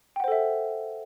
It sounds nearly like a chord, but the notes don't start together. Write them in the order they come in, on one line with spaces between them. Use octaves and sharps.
G5 F#5 C5 A4 E5